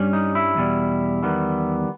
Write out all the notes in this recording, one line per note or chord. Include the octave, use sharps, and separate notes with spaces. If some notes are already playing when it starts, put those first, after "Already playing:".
Already playing: G2 G3 C#4
D#4
E4
E2 B2 G3
E2 D#3 G3 B3